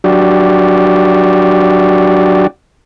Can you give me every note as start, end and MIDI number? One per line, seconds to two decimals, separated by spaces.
0.04 2.47 54
0.04 2.47 62
0.04 2.47 66
0.04 2.47 67
0.04 2.47 74